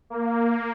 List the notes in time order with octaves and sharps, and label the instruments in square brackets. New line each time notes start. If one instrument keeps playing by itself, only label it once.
[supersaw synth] A#3